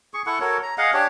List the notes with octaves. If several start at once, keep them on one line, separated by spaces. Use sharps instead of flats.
G#4 C#6
E4 A4 F#5 C#6
F#4 A4 A#4 C#5
A#5
G#4 D#5 F5 F#5
D4 G4 C#5